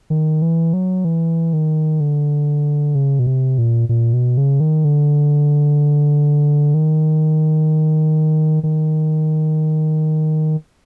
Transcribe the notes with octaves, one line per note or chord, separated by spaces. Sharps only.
D#3
E3
F#3
E3
D#3
D3
C#3
B2
C3
A#2
A#2
B2
C#3
D#3
D3
D#3
D#3